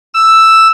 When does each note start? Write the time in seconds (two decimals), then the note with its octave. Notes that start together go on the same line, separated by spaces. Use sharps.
0.14 E6